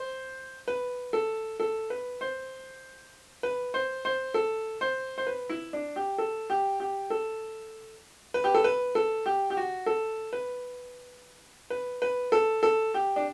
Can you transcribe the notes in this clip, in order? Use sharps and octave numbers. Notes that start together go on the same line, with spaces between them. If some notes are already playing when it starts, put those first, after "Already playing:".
Already playing: C5
B4
A4
A4
B4
C5
B4
C5
C5
A4
C5
C5
B4
E4
D4
G4
A4
G4
G4
A4
B4
G4
A4
B4
A4
G4
G4
F#4
A4
B4
B4
B4
A4
A4
G4
D4